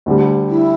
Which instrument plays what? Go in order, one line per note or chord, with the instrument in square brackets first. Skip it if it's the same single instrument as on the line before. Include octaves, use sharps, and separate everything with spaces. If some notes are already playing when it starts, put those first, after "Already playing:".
[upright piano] D2 D3 G3
[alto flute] E4